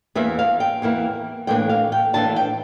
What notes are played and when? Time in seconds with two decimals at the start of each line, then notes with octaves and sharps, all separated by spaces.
0.15 E2 E3 A#3 E4 E5
0.39 F5
0.60 G5
0.82 E2 E3 A#3 E4
1.47 A2 E3 A#3 D4 G5
1.69 F5
1.92 G5
2.13 A2 E3 A#3 D4 A5
2.36 G5